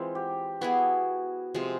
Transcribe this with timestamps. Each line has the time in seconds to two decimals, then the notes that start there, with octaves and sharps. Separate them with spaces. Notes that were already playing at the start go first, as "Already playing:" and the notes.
Already playing: E3 G#3 C4 F4
0.15 G4
0.61 B3 E4 F#4 G#4
1.55 C3 F3 G#3